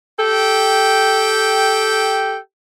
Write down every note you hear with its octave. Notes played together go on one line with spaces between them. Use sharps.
G4 A4 G5